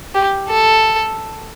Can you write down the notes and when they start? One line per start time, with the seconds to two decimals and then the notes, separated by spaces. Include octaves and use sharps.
0.15 G4
0.48 A4